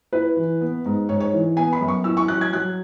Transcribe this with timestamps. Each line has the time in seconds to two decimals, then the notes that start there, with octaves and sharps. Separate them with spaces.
0.13 E4 B4
0.37 E3
0.61 B3
0.86 G#2
1.09 G#2 C#5
1.20 C#5
1.33 E3
1.57 B3 G#5
1.73 B5
1.81 F#2
1.88 C#6
2.04 E4 E6
2.17 C#6
2.28 F#3 F#6
2.41 G#6
2.53 F#3 F#6